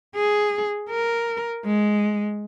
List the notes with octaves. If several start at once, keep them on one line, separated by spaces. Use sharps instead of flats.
G#4
A#4
G#3